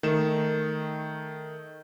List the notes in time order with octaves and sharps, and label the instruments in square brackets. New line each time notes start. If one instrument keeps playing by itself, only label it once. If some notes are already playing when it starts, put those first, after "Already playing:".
[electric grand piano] D#3 A3 E7